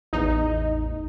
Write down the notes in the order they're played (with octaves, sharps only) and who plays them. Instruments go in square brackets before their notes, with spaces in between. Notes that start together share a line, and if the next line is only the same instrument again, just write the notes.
[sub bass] A1 [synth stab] E2 D#4